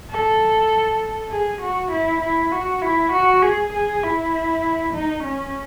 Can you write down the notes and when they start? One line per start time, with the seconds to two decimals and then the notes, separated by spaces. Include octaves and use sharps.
0.10 A4
1.31 G#4
1.62 F#4
1.92 E4
2.21 E4
2.52 F#4
2.82 E4
3.13 F#4
3.43 G#4
3.73 G#4
4.03 E4
4.94 D#4
5.24 C#4